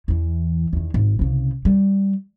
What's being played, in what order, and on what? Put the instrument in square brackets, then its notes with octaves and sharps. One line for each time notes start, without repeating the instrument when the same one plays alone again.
[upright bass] E2 E3
E2 D#3
G#1
C2 C#3
G3